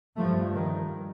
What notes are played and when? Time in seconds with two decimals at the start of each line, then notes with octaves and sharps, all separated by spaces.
0.17 G2 F3 A3
0.54 D#3